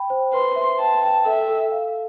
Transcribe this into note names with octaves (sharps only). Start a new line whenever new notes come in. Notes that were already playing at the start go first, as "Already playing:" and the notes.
Already playing: G5 B5
C5
B4 C6
E5
G5 A5
G5
A4 E5
A4
F5